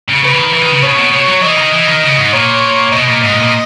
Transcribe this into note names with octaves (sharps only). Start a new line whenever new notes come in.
C#3
C#3 B4
E3
D#3
E3 B4
D#3
C#3
B2 C#5
C#3
B2
B2 C#5
F#3
E3 D#5
D#3
E3
D#3
C#3
G#2
A#2 C#5
B2 D#5
A#2
G#2 D#5
A#2
A#2